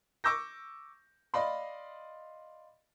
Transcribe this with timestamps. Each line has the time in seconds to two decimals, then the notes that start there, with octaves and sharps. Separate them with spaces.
0.24 C#6 D6 E6 G6 A#6
1.34 D5 D#5 F5 B5 C6